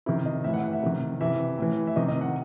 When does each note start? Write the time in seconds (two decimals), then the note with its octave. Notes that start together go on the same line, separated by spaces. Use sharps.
0.06 C3 D#3 E4
0.26 D#5
0.44 A2 E5
0.49 E3 F#5
0.64 F#5
0.73 E5
0.83 C3 D#3
1.21 C3 E3 E5
1.58 A2 E3
1.87 E5
1.96 C3 D#3 D#5
2.08 D#5
2.21 F#5